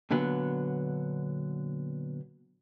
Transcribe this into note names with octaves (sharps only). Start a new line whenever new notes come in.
A#2 D3 F#3 B3